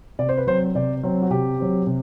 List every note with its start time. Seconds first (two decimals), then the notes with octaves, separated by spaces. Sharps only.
0.19 C3 D5
0.29 C5
0.37 B4
0.47 F#3 C4 C5
0.75 C3 D5
1.03 F#3 C4
1.22 F#4
1.30 C3 G4
1.59 F#3 C4
1.87 C3